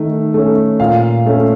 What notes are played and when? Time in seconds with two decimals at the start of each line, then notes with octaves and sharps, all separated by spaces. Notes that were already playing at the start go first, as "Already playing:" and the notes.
Already playing: D#3 A3
0.34 A3 C#4
0.80 A#2 F5
1.26 A3 C#4